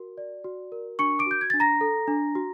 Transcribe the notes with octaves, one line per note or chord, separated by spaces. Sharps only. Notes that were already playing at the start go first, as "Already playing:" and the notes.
Already playing: F#4 A#4
D5
F#4
A#4
D4 C#6 C#7
D6 D7
F#4 G6
G#6
D4 A6
A#5 A#6
A4
D4
F#4